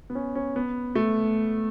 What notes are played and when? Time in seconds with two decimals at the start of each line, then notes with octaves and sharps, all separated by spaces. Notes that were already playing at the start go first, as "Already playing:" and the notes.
0.10 B3
0.15 C#4
0.35 C#4
0.56 B3
0.95 A3